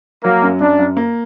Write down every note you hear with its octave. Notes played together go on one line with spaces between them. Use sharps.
F#3 A#3
F#2
F#2 D4
F#2
A#3